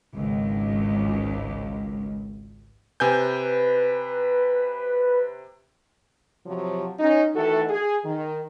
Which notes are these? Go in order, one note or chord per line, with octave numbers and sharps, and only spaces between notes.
G#1 C#2
C3 B4 G#5 G6
C3 F3 F#3
C#4 D#4
D#3 E3 A3 F#4 A4
G#4
D#3